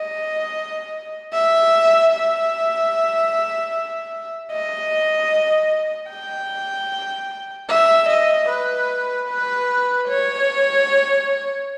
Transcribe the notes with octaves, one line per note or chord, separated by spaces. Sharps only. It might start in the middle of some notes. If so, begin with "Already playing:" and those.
Already playing: D#5
E5
E5
D#5
G5
E5
D#5
B4
B4
C#5